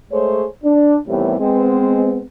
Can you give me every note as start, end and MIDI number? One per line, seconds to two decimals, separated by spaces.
0.12 0.45 56
0.12 0.45 57
0.12 0.45 68
0.12 0.45 72
0.12 0.45 73
0.64 0.98 62
1.08 1.35 45
1.08 1.35 48
1.08 1.35 51
1.08 1.35 52
1.08 1.35 55
1.08 1.35 59
1.39 2.23 56
1.39 2.23 59
1.39 2.23 60